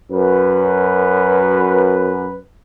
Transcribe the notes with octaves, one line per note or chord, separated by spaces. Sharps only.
F#2 B4